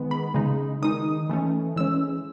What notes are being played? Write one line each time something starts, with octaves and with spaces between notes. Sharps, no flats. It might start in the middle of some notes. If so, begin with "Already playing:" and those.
Already playing: D#3 G#3 B3
B5
C#3 G#3 D#4
D#3 G#3 D#4 D#6
E3 A3 C#4
E3 G#3 C#4 E6